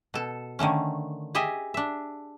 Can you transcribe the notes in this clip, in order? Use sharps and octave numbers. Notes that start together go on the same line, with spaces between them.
B2 A4
D3 D#3 A3 C#4
G4 G#4 D#5 E5 G#5
D4 E5